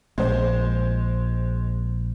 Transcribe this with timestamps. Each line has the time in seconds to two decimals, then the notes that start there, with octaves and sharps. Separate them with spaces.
0.18 A#1 G#3 C5